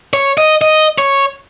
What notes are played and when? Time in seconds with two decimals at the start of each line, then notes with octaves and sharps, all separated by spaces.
0.13 C#5
0.38 D#5
0.61 D#5
0.98 C#5